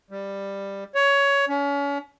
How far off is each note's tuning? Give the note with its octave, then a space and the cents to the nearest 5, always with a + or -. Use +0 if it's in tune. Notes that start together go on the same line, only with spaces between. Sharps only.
G3 +10
C#5 +15
C#4 +35